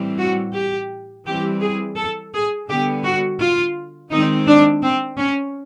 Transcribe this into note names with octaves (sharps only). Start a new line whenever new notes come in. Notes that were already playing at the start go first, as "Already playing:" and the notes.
Already playing: A2 E3 G3 C4
F#4
G4
E3 G3 C4 G4
G#4
A4
G#4
D3 G3 B3 G4
F#4
F4
D#3 G#3 C4 D#4
D4
C4
C#4